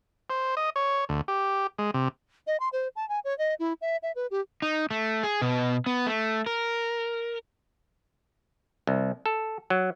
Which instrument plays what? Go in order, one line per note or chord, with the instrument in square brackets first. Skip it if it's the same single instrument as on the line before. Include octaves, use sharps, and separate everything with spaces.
[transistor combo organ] C5
D#5
C#5
D2
G4
G#3
C3
[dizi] D#5
C6
C5
A5
G#5
C#5
D#5
E4
E5
E5
B4
G4
[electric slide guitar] D#4
A3
G#4
B2
B3
A3
A#4
[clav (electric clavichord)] C2
A4
F#3